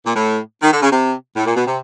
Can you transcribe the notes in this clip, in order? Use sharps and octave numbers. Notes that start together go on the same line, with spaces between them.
A#2
A2
D#3
D3
C#3
C3
A2
A#2
B2
C3